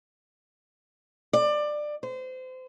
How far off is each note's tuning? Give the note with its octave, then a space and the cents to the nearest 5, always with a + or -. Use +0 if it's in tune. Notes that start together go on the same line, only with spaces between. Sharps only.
D5 +20
C5 -30